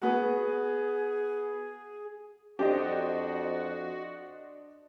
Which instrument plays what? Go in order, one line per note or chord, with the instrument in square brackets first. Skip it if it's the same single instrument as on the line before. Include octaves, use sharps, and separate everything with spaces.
[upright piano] B3 F#4 [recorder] G#4
[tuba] F2 [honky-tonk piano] D4 C5 D#5 [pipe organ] F#4 [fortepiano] G4